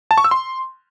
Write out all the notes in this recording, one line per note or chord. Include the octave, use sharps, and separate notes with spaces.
A5
C#6
E6
C6